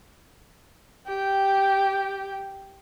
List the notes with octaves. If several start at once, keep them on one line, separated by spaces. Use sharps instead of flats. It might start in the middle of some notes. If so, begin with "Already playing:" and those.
G4 G5